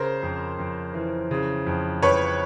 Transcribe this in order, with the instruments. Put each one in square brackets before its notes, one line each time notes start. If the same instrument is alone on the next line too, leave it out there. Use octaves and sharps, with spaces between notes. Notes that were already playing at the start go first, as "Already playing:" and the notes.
Already playing: [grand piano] C#3 [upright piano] A#4 C5
[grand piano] F2
F2
E3
C#3
F2
[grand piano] F2 [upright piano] B4 C#5